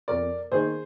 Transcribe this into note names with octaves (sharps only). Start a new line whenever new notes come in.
F2 A#4 D5
D#3 A#3 D#4 G#4 C5